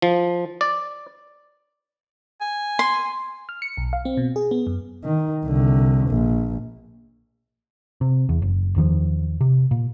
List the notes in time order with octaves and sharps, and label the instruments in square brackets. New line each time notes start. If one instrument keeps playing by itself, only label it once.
[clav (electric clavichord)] F3
D5
[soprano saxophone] G#5
[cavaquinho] C6
[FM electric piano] F6
C#7
B1
F5
C4
B2
G#4
B3
F#2
[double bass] D#3
C2 D3
A#1
[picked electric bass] C3
E2
F#1
E2 D#3 F3
C3
A#2